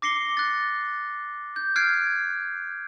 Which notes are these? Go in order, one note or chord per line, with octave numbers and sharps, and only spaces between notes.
D6 A#6 C7 C#7 G7
F#6 A6
G6
F6 F#6 G#6 C7 D7